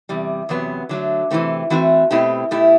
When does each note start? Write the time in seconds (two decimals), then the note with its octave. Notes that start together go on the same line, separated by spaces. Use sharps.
0.09 E2 C3 G3
0.49 E2 C3 F#3 B3
0.89 D3 F#3 A3
1.30 C3 E3 A3 C4
1.70 E3 A3 C4 F#4
2.11 B2 A3 C4 E4 G4
2.51 B2 A3 E4 G4